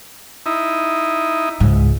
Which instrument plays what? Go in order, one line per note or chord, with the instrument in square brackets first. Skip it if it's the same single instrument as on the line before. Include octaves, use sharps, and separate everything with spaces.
[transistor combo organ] D#4 E4
[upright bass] C#2 G#2